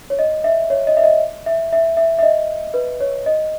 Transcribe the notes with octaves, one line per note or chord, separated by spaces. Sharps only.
C#5
D#5
E5
C#5
D#5
E5
D#5
E5
E5
E5
E5
D#5
B4
C#5
D#5